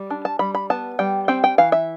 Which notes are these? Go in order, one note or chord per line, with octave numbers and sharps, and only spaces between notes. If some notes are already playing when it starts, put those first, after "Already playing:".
Already playing: G3
D4
A5
G3 B5
B5
B3 A5
G3 G5
C4 G5
G5
E3 F5
E5